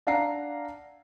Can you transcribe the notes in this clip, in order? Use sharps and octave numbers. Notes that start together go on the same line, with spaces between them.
D4 F5 F#5 A#5 C7